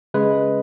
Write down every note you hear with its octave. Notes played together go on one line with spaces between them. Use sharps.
C#3 G#3 B4